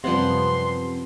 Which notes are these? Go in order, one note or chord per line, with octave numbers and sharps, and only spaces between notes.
F#2 C3 F3 G3 B3 C4 F#5 C6